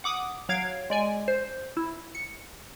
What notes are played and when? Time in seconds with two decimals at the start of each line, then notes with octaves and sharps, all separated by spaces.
0.04 F#5 D6 D#6
0.49 F#3 F5 G#6 D7
0.90 G#3 D5 G#5
1.28 C5
1.77 E4
2.15 C#7